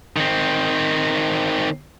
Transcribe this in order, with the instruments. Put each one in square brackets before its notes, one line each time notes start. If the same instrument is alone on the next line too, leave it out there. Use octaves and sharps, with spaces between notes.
[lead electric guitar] D#3 C4